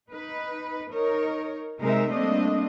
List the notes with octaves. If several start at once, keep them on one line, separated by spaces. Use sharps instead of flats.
D#4 B4
D#4 A#4 C#5
C3 G#3 D#4 A#4 E5
G3 A3 A#3 C4 D4 D#5